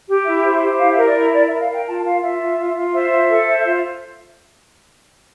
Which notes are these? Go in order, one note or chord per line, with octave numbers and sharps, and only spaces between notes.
G4
E4 E5
C5
G4
E4 F5
E5
A#4
D5
E4 E5
A#4 D5
A#4 E5
F5
A#4 G5
F4 A5
F4 F5
F4 E5
F4
F4
F4
C5 E5
F4
A4
C5
F4